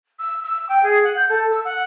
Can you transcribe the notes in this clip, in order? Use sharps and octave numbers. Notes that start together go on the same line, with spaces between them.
E6
E6
G5
G#4
F#5
G6
A4
E6
F#5